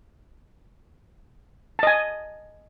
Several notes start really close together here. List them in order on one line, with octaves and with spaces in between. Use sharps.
A5 D#5 G#5